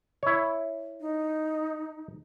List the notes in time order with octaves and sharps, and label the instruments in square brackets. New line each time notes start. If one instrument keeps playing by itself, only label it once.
[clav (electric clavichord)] E4 C#5
[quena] D#4